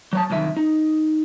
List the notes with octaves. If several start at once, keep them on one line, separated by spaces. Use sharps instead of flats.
F#3 C#5 A5
C2 F#2 D#3 E5
D#4